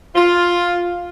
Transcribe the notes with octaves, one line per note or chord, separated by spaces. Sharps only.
F4